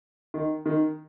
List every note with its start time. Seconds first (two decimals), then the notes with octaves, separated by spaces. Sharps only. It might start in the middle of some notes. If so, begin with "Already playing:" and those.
0.34 D#3
0.66 D#3